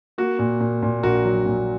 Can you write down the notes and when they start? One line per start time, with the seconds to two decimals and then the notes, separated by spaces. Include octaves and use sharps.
0.18 A#3 F#4
0.39 A#2
0.61 A#2
0.83 A#2
1.03 A#1 F#4 A#4
1.25 F#3
1.46 A#2